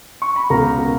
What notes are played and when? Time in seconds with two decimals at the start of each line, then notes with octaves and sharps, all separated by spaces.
0.22 C#6
0.36 B5
0.50 C#2 B2 A#4 A#5